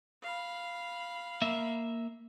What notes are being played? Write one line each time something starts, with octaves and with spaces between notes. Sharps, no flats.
F5 B5
A#3 E5